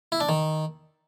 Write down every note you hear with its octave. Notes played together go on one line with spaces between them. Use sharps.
E4
D4
D#3